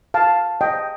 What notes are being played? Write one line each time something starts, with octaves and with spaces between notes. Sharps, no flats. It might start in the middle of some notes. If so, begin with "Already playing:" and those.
F5 A5
D#5 G5